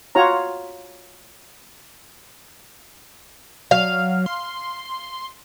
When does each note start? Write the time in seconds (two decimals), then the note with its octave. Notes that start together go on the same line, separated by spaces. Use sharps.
0.15 F4 F#4 C#5 A#5
3.71 F#3 F5
4.26 C6